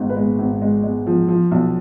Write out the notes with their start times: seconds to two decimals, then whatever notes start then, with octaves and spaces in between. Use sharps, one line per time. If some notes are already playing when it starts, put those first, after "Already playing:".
Already playing: G#1 G#2
0.09 B4
0.16 G#3
0.39 G#1
0.62 G#3
0.83 G#3
1.07 F3
1.28 F3
1.51 B1